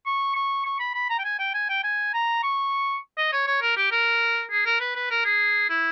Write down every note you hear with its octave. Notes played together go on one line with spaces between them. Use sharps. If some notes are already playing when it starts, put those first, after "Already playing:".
C#6
C#6
C#6
B5
B5
A#5
G5
G#5
G5
G#5
G5
G#5
A#5
C#6
D#5
C#5
C#5
A#4
G4
A#4
G#4
A#4
B4
B4
A#4
G#4
E4